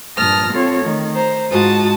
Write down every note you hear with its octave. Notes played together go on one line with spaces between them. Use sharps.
G2 A#2 A5 D#6 F6 A#6
C4 F4 A4 C#5
D#3 A3
C5 A#5
G#2 F4 F#4 A5 D#6